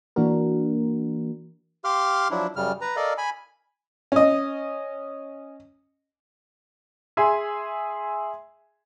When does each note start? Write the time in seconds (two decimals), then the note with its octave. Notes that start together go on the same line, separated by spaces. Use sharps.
0.16 E3 A#3 D4 F#4 A#4
1.84 G4 F5 C6 D6 F6
2.31 F3 F#3 D4 E4
2.56 F#2 C#3 G3 F6
2.81 B4 A#5
2.96 A4 A#4 D5 D#5 F5
3.18 G#5 B5
4.12 C#4 D#5
7.17 G#4 E5 G#5 C6